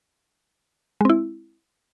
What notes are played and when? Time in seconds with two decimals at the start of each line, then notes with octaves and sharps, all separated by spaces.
1.01 G#3
1.05 C4
1.10 E4